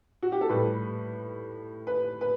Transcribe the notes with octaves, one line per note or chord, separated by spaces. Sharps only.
F#4
G4
A4
A2 G3 B4
B4
B4